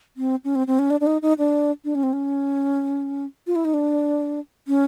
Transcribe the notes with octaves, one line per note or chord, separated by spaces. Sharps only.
C4
C#4
C4
C4
C#4
D4
D4
D#4
D#4
D4
D4
C#4
C4
C#4
F4
E4
D#4
D4
C#4